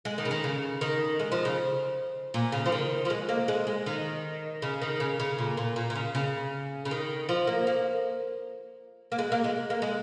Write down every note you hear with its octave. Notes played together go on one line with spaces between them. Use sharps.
G#3
D#3
C#3
D#3
C#3
D#3
G#3
F3
C#3
A#2
C#3
F3
D#3
F3
G#3
A#3
G#3
G#3
D#3
C#3
D#3
C#3
C#3
A#2
A#2
A#2
A#2
C#3
C#3
C#3
D#3
F3
A#3
A#3
A#3
G#3
A#3
G#3
A#3
G#3